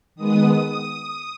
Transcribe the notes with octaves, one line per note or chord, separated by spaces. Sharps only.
D#3 G#3 B3 D#6